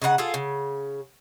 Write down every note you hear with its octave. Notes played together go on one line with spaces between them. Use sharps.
C#3 D#4 B4 F#5
F4 G#4 A4
C#3